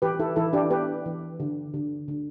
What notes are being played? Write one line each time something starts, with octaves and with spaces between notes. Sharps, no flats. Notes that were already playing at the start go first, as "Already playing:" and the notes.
E3 G4 B4
E4 A4
E3 E4 A4
D4 G4
B3 G4 B4
E3
D3
D3
D3